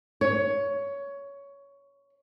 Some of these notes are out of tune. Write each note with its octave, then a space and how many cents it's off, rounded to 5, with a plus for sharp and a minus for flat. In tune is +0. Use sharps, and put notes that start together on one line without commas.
C#5 +15